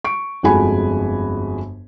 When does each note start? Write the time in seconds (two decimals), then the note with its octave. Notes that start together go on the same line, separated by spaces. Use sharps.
0.04 C#6 D7
0.43 G1 F2 G#3 F#4 G#5 B5